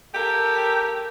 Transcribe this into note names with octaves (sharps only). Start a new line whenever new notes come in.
G4 A4 A#4